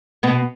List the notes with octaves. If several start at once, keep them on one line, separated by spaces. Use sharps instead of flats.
B2 B3